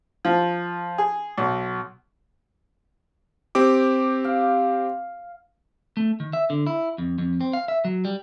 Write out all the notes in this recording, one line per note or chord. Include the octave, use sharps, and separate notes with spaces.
F3
G#4
B1
C4 G4 D6
F5
A3
D#3
E5
D3
E4
F2
F2
C4
F5
E5
F#3
G3